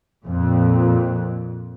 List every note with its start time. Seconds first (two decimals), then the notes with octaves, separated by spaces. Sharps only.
0.25 F2 A#2